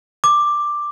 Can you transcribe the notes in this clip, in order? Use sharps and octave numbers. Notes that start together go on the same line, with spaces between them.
D6